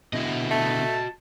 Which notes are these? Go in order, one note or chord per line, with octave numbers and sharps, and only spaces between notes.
B2 D3 E4 F#4 D#5
A3 A5